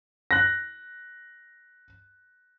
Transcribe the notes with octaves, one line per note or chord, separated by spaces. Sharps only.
F#6 A#6